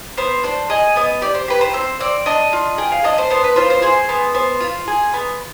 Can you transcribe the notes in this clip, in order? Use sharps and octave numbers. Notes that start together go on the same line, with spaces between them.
B3 C5
D4 C5
G#4 D#5
B3 D#5
G4 D5
C5
G4 B4
C5
C4 C5
C4 D5
D4 D#5
F4
G#4 G5
F5
D4 D#5
C5
B3 C5
B4
F4 C5
C5
G#4 C5
B3
B3 C5
F4
G#4
B3